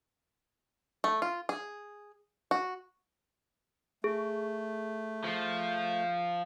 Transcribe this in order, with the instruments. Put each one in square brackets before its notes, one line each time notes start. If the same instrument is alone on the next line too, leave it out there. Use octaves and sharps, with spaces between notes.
[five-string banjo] A3
F4
G#4
F#4
[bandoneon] A3 [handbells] G#4
[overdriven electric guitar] F3